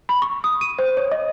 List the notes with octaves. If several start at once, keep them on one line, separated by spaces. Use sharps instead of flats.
B5
C#6
D#6
D#7
C5
C#5
D#5